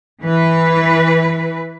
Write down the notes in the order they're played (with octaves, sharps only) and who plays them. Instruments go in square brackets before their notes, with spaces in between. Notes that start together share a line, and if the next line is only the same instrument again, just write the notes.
[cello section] E3 B4